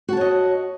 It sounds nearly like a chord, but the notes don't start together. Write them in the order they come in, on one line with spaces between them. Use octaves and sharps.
F#4 A5 C#5 D#5